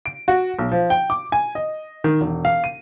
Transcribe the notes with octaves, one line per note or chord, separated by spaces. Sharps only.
D7
F#4
B1
F3
G5
D6
G#5
D#5
D#3
E1
F5
D#7